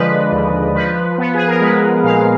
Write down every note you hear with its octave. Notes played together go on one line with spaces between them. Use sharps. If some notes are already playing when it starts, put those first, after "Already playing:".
Already playing: D3 F3 G#3 B4 D5 D#5
D#2
F3 B4
B3
G#4
A#4
G#3 B4
A#2 F5